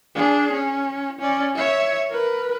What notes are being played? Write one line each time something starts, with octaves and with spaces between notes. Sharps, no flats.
D4 G#4
C#4
C#4 D5
C#5 E5
A#4 B4